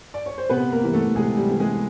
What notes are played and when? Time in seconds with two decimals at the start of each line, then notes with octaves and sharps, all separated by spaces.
0.14 D5
0.26 C#5
0.38 C5
0.50 C3 B3 B4
0.72 A#3 A#4
0.83 E3 G3 B3
0.93 A3 A4
1.15 C3 G#3 G#4
1.37 G3 G4
1.49 E3 G3 B3
1.60 G#3 G#4